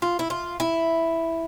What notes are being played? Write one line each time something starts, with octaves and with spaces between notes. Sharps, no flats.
F4
E4
F4
E4